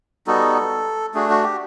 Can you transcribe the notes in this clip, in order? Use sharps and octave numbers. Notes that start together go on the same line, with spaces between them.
G3 B3 D#4 F#4 A4
A3 D4 F#4 G#4
F#4
G4